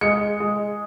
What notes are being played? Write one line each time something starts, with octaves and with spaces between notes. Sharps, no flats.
G#3 C#7
G#3